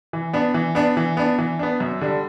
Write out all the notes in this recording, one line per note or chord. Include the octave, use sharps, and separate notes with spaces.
E3
B3 D4
E3
B3 D4
E3
B3 D4
E3
B3 D4
F#2
D3 G3 D4